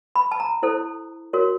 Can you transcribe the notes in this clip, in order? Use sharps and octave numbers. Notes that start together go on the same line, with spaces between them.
B5
A5
A#5
E4 A4 C5
F#4 A#4 C#5